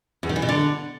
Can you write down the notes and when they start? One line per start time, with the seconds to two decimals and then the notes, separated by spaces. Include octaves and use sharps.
0.23 E2
0.29 D#3
0.36 E3
0.42 B2
0.49 D3